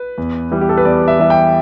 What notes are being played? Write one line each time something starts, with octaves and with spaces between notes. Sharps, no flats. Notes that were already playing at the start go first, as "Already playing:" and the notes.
Already playing: B4
E2
E3 G3
G4
A4
B4
E2 D5
E5
E3 G3 E5
G5